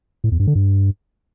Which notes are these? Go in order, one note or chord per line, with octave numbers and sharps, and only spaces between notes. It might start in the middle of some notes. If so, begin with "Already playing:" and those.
A2
E2
G2
D3
G2